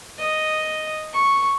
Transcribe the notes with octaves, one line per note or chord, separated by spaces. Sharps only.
D#5
C#6